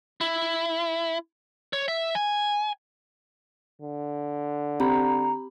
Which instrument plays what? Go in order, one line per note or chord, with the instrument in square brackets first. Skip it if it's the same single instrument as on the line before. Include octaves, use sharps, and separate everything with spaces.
[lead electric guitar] E4
C#5
E5
G#5
[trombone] D3
[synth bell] C4 G4 B5 [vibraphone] A#5